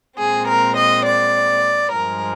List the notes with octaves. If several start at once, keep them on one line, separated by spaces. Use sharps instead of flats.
A#2 G#3 C4 G#4
A#4
D#5
D5
G2 F3 G#3 A#4